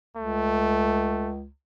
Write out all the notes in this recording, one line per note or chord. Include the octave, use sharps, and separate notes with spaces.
C#2 A3